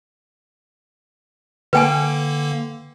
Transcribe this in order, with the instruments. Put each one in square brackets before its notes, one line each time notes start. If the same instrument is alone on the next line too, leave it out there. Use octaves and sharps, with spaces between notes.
[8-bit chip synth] D3 A#3 [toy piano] B4 G5 G#5